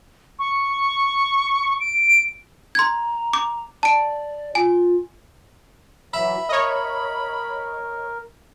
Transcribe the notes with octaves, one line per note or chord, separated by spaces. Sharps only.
C#6
D7
A#5 C6 G#6
D6
D5 A5 D7
F4 G#5
E3 F#3 E5 B5
A#4 C#5 D#5